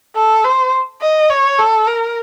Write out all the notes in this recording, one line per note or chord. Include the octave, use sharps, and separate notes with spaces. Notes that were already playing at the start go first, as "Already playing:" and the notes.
A4
C5
D#5
C#5
A4
A#4